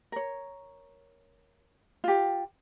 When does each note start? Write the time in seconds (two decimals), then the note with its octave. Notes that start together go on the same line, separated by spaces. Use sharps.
0.12 A#4 C#5
2.04 F4 G4